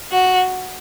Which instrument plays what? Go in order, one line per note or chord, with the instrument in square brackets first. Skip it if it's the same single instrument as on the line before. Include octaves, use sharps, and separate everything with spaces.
[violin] F#4